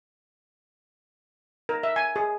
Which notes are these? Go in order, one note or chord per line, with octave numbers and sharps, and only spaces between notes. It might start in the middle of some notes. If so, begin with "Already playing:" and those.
A#4
E5
G#5
G#4